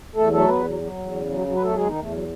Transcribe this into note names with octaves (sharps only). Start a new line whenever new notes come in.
E2 A3 A4
F#3 A3 A4
E2 B3 B4
F#3
F#3
E2
C#3
F#3
F#3
B4
E2 A3 A4
F#4
E2 G#3 G#4
D#3 D#4
E2 A3
F#3